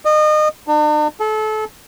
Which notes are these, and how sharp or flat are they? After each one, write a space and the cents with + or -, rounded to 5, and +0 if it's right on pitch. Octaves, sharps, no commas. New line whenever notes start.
D#5 -30
D4 +45
A4 -30